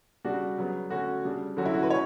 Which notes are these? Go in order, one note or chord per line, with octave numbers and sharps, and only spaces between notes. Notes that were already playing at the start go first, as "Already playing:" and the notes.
C#3 G3 D4 F#4
C#3 F#3 B3
D3 A3 C#4 F#4
C#3 G3 D4
D3 F#3 C#4 F#4
E4
F#4
B4
C#4 C#5